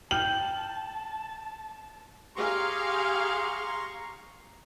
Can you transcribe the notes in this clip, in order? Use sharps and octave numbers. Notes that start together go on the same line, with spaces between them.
G5 A5 F6 G6 F#7
G4 G#4 F5 A#5 C6 C#6